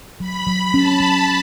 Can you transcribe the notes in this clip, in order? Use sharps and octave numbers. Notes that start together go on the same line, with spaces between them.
F#3 B5
F#3
C#4 A5
F#3